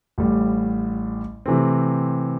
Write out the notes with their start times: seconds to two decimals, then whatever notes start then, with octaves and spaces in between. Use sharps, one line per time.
0.18 A1 A2 G3
1.46 C3 E3 A3 C4